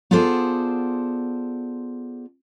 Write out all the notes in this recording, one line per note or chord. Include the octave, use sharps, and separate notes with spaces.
B3 F4 G#4 A4 C5 D5